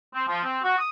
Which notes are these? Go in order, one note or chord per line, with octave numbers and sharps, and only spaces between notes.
C4
F3
C4
F#4
D#6